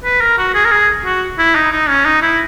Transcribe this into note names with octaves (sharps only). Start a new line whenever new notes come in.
B4
A#4
F#4
G#4
A#4
G#4
F#4
E4
D#4
D#4
C#4
D#4
E4